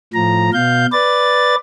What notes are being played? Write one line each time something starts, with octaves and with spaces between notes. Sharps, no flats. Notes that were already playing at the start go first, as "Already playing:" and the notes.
A2 F3 A#5
B2 F5 G6
B4 D5 A6